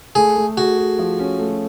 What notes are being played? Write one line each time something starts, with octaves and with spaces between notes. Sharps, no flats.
A3 G#4
A3
F#4 G#4
G#4
F3
C#4
A3